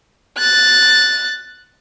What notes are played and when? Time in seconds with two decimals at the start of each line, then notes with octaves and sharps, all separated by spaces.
0.38 F#6 A6